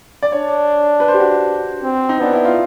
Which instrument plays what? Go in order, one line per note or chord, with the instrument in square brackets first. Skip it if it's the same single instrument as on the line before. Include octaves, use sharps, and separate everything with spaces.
[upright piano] D5
[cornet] D4 [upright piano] C#5
[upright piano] B4
C5
G4
F#4
[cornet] C4
[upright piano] D#4
[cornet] B3 [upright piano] D4
[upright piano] E4
F4